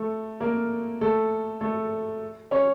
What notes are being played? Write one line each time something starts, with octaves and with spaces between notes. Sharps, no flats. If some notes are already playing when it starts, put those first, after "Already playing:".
Already playing: A3 A4
A#3 A#4
A3 A4
A3 A4
C#4 C#5